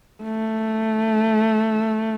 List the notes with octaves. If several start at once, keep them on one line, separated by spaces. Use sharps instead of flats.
A3